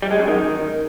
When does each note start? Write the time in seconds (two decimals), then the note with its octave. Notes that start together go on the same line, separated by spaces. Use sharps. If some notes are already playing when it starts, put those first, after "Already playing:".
0.02 G3
0.11 G#3
0.19 F#2
0.28 D#3